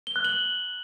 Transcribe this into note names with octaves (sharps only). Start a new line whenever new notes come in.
G7
F#6
F#7